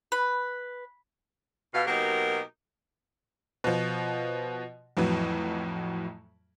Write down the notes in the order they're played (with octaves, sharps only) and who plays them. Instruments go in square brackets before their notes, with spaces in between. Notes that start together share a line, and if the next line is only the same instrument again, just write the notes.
[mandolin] B4
[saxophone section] B2 F5
B2 F#3 A#3 D#4 G4 A#4
[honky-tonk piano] B2 F3
F2 A2 E3 F#3